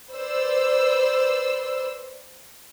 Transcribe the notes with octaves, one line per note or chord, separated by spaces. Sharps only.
B4 C5 D5 C6 E6